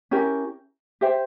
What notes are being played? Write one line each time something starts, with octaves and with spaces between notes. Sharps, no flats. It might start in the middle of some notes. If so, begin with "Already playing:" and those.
C#4 E4 G4 A#4
G4 C5 E5 G5